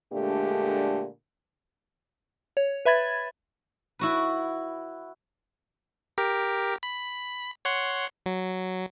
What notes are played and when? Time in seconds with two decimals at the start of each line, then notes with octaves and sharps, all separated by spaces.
0.13 A#2 D3 G#3 A3 D4 G4
2.57 C#5
2.85 B4 E5 B5 G#6 A6
3.99 E4 F#4 B4
6.18 G4 A#4
6.83 B5
7.65 C#5 F#5 C6
8.26 F#3